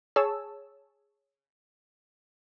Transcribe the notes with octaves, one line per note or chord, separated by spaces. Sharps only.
G#4 C#5 A5 E6